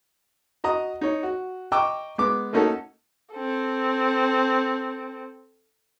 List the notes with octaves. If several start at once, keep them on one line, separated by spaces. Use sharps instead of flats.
F#4 D#5 A#5 D#6
D#4 C#5
F#4
D#5 G5 A#5 C#6 D6 E6
G#3 B3 D6
A3 A#3 C#4 D#4 F#4 A4
C4 A4